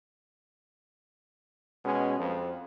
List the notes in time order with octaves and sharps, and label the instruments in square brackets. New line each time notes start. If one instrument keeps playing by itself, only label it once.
[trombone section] B2 G#3 C#4
F2